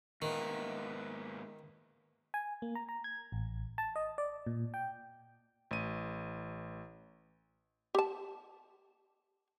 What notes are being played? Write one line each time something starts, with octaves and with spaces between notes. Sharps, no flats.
G#2 D#3 A#3 B3
G#5
A#3
A#5
A#5
G#6
A1
A5
D#5
D5
A#2
G5
A1 D#7
G4 A5